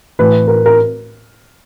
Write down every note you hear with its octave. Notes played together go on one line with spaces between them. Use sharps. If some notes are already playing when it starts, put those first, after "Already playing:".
A2 E3 B4
A#4
A#4